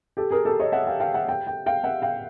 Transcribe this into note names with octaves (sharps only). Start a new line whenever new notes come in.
G4 A4
G#4 A#4
G4 A4
C#5 D#5
E5 F#5
F5 G5
F5 G5
E5 F#5
G5
G5
F5 G5
E5 F#5
F5 G5